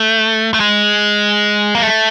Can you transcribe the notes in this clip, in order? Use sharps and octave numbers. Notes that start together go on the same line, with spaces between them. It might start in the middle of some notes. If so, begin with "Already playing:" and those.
Already playing: A3
A3
G#3
A#3
A3